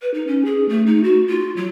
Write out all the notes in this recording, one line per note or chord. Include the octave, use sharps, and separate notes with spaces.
B4
D#4
C#4
G#4
A3
D#4
F#4
F4
F#3